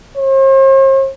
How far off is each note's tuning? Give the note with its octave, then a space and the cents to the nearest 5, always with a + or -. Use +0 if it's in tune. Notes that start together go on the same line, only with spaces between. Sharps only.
C5 +45